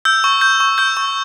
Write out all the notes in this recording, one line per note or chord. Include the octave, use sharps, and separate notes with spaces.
E6 G6
C#6
G6
C#6
E6 G6
C#6